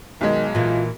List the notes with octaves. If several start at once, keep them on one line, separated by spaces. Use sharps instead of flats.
B1 D#3 G#3
A#2 E3 F4